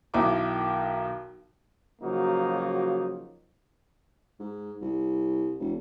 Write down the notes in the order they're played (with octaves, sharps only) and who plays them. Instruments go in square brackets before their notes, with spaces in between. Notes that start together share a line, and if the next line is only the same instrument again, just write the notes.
[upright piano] B1 D#3 D#4 E4 A#4 D6
[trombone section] C#3 F3 F#3 A#3 D#4 F#4
[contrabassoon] G#2
C2
E1